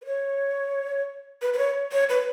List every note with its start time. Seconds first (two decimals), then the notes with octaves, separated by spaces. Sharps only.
0.02 B4
0.05 C#5
1.42 B4
1.53 B4
1.58 C#5
1.92 C#5
2.09 B4